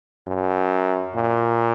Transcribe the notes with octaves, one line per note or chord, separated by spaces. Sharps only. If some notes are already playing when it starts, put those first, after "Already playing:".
F#2
A#2